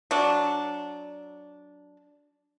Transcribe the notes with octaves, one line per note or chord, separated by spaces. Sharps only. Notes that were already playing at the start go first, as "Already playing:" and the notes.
F#3 D4